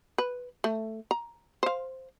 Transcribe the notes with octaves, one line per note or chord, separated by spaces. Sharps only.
B4
A3
A#5
C5 F5